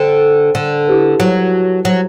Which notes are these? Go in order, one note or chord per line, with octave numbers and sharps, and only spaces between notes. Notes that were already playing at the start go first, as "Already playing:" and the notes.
Already playing: D3 C5 G5
D3
E4 G4 B4
F#3
F#3